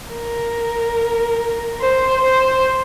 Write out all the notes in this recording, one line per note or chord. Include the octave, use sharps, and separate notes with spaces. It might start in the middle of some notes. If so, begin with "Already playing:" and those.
A#4
C5
C5